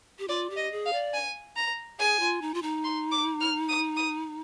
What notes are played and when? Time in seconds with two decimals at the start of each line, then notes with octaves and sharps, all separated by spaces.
0.19 G4
0.28 F4 D5
0.50 G4
0.57 D#5
0.72 G#4
0.85 F5
0.93 D5
1.14 G#5
1.56 A#5
1.99 G#4 G#5
2.19 F4
2.41 D#4
2.54 F4
2.62 D#4
2.84 C6
3.11 D6
3.41 F6
3.69 D#6
3.96 D#6